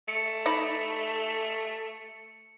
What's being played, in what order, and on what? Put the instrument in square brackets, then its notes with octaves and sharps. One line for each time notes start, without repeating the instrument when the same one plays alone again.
[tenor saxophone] A3 [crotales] C#7
[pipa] D#4 D5 B5